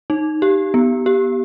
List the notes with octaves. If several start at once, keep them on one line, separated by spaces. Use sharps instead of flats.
D#4
G4
B3
G4